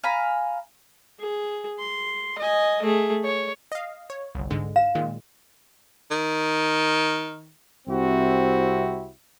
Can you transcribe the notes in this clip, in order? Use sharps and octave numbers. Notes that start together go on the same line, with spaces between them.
F5 G#5 A#5 B5
G#4
C6
D#5 G#5
A3 G#4
C#5
D#5 F5
C#5
G1 C2
G#2 D3 G#3
F5 E7
A#2 D#3 G#3
D#3
C2 C3 C4 E4 F#4